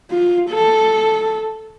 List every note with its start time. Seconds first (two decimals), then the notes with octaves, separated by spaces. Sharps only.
0.11 F4
0.50 A4